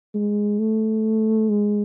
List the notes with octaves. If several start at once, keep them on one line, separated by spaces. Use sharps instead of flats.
G#3
A3
G#3